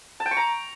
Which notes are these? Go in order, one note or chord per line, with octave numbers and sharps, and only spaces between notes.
A5
G5
C#6
A#5